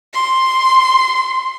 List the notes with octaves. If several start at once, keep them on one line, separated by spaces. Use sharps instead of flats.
C6